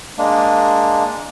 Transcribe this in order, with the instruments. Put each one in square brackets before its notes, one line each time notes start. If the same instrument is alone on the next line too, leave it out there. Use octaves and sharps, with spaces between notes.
[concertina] G#3 A#3 D4